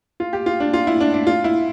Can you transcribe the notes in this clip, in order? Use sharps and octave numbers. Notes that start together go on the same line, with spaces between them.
F4
G4
F4
D4
F4
E4
D4
D4
F4
E4